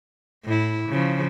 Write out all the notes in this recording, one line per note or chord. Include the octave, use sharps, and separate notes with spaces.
A2 E4
C#3 F3